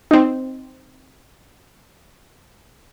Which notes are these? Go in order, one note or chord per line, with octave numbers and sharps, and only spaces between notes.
C4 D#4